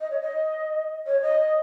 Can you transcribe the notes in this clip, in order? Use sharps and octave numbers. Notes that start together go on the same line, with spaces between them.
D#5
C#5
D#5
C#5
D#5